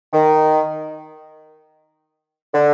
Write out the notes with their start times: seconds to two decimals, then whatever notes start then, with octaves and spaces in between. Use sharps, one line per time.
0.13 D#3
2.54 D3